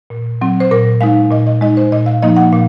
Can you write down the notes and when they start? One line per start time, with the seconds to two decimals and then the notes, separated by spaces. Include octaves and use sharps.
0.10 A#2
0.41 F#3 C4
0.60 C5
0.71 A#2 A#4
1.01 G#3 D#4 F5
1.31 A#2 D#5
1.47 D#5
1.61 G#3 D#4 D#5
1.77 C5
1.92 A#2 D#5
2.06 F5
2.22 F3 A#3 D#4 D#5
2.36 F#5
2.52 A#2 F5